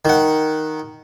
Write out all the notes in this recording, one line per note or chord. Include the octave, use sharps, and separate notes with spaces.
D#3 F#5